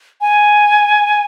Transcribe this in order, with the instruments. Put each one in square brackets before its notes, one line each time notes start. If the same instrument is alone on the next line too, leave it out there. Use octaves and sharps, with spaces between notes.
[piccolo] G#5